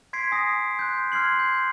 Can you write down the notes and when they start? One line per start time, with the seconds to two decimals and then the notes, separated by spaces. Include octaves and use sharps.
0.13 C6 G#6 B6 C7 D7
0.32 G#5 D#6 A#6
0.79 C6 F#6 G6
1.12 C6 F6 G#6 C7 F#7
1.39 F6 G6